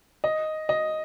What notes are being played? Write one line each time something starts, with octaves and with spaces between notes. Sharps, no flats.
D#5
D#5